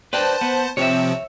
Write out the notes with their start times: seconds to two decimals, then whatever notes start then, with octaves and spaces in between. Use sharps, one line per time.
0.13 B4 C5 D5 G5 A5
0.41 B3
0.77 C3 F3 C4 C#5 E5